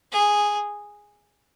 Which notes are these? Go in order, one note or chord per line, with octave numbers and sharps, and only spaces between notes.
G#4